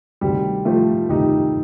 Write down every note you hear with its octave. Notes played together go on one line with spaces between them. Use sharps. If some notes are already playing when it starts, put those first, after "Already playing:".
D2 C3 D#3 G3
F3 A3
D2 C3 D#3 D#4 G4